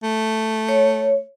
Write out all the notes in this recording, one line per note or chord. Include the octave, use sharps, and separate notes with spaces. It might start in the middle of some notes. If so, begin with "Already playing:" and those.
A3
C#5